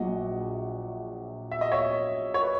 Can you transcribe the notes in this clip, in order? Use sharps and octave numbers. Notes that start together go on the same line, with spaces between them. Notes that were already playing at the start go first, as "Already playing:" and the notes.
Already playing: A#1 A#2 F#3 D#5 F#5
E5
D#5
C#5 E5
C#5
B4